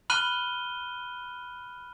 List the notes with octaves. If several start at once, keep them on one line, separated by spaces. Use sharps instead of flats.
B5 F6 F#6 D#7 G7